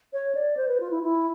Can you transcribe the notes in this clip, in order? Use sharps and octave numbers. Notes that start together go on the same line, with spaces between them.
C#5
D5
C5
B4
F4
E4
E4